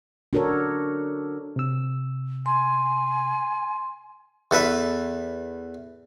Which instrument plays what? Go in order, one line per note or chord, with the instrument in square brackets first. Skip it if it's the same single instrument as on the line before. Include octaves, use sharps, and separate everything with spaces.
[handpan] D4 F#4 A4 A#4 C#5
[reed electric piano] C3 E6
[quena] G#5 [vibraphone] C6
[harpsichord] E2 A4 B4 E5